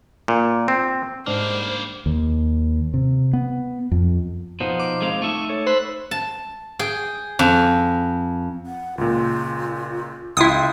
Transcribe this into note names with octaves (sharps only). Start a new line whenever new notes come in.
A#2
C4
G#2 G3 A#3 D4 C5 F6
D#2
C3
B3
F2
B2 F3 B3 D#4 C5
D6
G#3 C4 F5
A3 D#4 E5 C#6
A4 C#5
C5 B5 E6 F#6
A5
G#4 G5
F2
F#5
C#2 A#2 F4
C#2 E4 F5 G5 C6 D#6